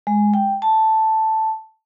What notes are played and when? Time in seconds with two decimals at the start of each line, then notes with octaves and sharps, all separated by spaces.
0.07 G#3
0.34 G5
0.62 A5